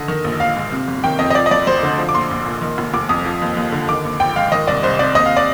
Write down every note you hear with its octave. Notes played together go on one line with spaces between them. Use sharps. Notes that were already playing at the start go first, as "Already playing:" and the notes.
Already playing: D3 D#5
D#3
A#1
A#1 F5
G#2
C3
G1
D#3 G5
F2 D#5
D#5
F3 D5
D#5
D2 D5
D2 C5
D3
F3
D6
A#1 C6
A#1
A#2
D#3
F1
F1 D6
F2 D#6
F3
D#2
D#2
D3
D#3 D6
A#1
A#1 G5
G#2 F5
D#3 D#5
C2 D5
C2 C5
C3 D5
D#2 D#5
F5
D5